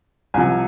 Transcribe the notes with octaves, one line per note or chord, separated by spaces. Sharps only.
C2 C3 F3 G#5